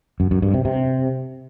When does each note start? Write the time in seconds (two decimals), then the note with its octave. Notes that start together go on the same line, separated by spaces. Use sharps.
0.20 F#2
0.31 F#2
0.42 G2
0.54 C3
0.65 C3